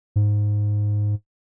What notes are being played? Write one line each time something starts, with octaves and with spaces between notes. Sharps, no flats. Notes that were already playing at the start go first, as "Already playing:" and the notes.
G#2